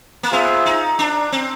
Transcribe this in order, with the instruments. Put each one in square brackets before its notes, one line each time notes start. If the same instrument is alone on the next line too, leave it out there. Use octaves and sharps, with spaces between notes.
[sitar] A#3
[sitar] B3 [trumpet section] F4 G#4 C5 E5
[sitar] D#4
D4
C4